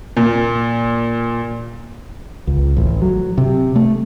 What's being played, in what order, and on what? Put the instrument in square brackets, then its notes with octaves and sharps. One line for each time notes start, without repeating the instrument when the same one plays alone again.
[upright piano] A#2
[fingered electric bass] C#2
A1
F#3
C3
A3